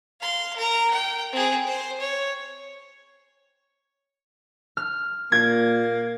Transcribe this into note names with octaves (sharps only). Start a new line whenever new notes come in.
F5 C6
A#4 A#5
G5
C4 G#4
C5
C#5
F6
A#2 A#3 G#6